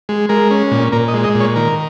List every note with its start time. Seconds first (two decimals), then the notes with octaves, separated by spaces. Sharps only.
0.09 G#3
0.29 G#3 A#4
0.51 C#4
0.71 A#2
0.92 A#2 A#4
1.08 D#5
1.14 G#3
1.24 D#5
1.35 A#2
1.40 C#5
1.56 D#3 A#4